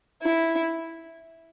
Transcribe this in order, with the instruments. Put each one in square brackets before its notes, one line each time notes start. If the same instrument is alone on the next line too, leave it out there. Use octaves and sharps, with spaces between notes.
[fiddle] E4